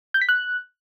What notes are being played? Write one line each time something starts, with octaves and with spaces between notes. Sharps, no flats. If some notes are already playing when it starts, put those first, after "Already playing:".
G6
B6
F#6